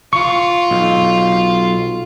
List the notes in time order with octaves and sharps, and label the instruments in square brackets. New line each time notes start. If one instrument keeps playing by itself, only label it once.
[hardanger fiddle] F4 [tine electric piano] C#6
[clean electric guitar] B1